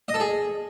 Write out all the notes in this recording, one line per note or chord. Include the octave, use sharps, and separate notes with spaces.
D#5
A4
G#4